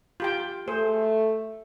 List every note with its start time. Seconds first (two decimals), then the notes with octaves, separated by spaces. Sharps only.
0.20 F4 G4 G5
0.68 A3 G#4 C5